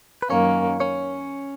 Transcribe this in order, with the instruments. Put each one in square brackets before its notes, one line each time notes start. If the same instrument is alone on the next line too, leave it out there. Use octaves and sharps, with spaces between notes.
[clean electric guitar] B4
[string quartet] F#2 D#3 A#3 [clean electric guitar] C#4 C#5
[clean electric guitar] C#4 C#5